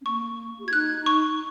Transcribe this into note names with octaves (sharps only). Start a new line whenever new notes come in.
C#4
A#3 C#6
G#4
F#4 G#6
D#4 F#6
C#6